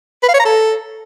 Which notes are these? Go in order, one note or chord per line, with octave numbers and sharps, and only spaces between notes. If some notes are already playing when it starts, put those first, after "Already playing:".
B4
F5
C#5
A#5
A4